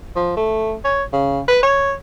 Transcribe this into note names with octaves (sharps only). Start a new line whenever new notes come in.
F3
A3
C#5
C#3
B4
C#5